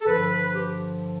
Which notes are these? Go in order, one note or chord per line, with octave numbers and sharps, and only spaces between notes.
A4
G2 D3 F3 B4
G4